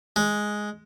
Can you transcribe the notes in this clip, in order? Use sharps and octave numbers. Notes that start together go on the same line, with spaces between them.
G#3